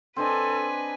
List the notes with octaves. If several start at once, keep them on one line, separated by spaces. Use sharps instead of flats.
C4 D4 A4 B4 D#5 G#5